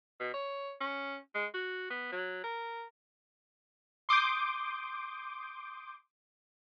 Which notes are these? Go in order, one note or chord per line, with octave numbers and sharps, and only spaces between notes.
B2
C#5
C#4
G#3
F#4
B3
F#3
A#4
C6 D6 D#6 G6